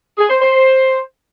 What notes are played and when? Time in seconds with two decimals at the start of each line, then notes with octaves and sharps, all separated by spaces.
0.17 G#4
0.29 C5
0.41 C5